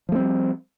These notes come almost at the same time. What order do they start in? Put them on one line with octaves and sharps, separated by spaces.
F3 A3 C4 G3